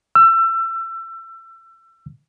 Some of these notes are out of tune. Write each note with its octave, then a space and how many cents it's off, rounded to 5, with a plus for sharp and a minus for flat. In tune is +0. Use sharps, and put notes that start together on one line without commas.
E6 +30